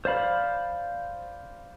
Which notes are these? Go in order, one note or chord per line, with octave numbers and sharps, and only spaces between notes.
C5 D5 F5 B5